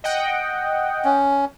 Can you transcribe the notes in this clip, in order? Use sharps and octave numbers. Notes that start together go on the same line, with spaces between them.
D#5 F#5 G5
C#4